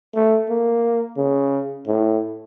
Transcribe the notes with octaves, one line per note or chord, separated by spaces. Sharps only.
A3
A#3
C#3
A2